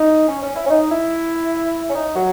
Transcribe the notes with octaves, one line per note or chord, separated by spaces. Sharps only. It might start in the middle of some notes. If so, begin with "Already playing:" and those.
Already playing: D#4
C#4
C#4
E4
C#4
D#4
E4
C#4
D#4
F#3